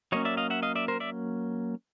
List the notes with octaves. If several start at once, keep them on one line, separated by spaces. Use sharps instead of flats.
F#3 A#3 C#4 C#5 D#5
D5 E5
D#5 F5
E5 F#5
D#5 F5
D5 E5
A#4 C5
D5 E5